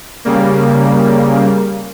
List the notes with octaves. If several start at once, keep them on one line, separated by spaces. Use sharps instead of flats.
C#3 G3 A#3